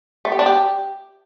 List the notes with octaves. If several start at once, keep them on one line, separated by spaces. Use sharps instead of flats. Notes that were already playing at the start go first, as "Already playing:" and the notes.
A3
G4
D4
G4